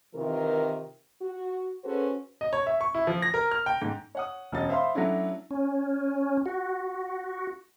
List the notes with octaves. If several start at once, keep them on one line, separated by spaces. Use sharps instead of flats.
C3 D#3 E3 F4 A#4
F#4
C#4 F#4 G#4 A4 B4 C5
D#5
C#5
E5
C#6
E4
F3
A#6
A#4
F6
G5
G#2
C#5 F#5 D#6
E1 F#2 D#5 A6
C5 E5 F5 B5 C6
F#3 A3 C#4 D4 E4
C#4
F#4